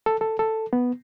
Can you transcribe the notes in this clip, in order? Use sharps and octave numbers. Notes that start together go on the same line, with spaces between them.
A4
A4
A4
B3